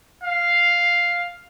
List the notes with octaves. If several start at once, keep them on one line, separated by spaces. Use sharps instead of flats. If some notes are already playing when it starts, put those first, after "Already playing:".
F5